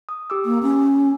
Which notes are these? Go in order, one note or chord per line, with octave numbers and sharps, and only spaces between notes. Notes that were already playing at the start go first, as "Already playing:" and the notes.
D#6
G4 D6 E6
A#3
C#4